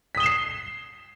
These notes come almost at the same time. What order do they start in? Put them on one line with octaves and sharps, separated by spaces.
B6 D#6 G7 E7 C7